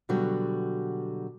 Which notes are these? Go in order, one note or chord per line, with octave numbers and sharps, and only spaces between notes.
B2 D3 F#3 G3 F#4